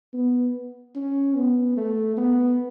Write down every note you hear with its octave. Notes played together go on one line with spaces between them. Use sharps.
B3
C#4
B3
A3
B3